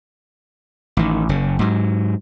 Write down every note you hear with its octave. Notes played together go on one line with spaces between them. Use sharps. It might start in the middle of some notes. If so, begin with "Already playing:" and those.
A1 D#3
F#1 C#3
G#2 F#3